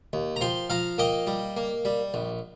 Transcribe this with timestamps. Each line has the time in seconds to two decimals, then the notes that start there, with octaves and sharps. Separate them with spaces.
0.13 D#2
0.36 A#5
0.41 F3 G5 C6
0.70 F3 F5 A#5
0.98 A#3 D#5 G5
1.27 G3
1.57 A#3
1.85 G3
2.14 A#1